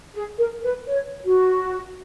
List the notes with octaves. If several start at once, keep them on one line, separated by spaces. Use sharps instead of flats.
G#4
A#4
B4
C#5
F#4